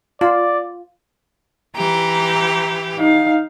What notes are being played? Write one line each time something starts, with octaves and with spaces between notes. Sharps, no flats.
F4 D5
E3 G4 A#5
D#4 F5